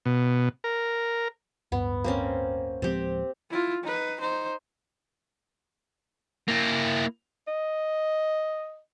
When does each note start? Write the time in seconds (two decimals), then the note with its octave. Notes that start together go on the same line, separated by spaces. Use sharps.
0.05 B2
0.64 A#4
1.72 D1 G2 B3
2.04 A#3 C4 C#4
2.82 D1 F3 G#3 C4 G4
3.51 E4 F4
3.84 D#4 B4
4.20 D#4 C5
6.48 A#3 E4
7.48 D#5